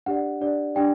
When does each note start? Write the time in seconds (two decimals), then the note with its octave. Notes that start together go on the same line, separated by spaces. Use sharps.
0.06 D4 G4 D5 F#5
0.41 D4 G4 D5
0.75 D4 G4 D5 G5